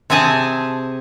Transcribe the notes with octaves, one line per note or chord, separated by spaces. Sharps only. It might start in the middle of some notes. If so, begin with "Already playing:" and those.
C3 C4 G#4 G#5 A5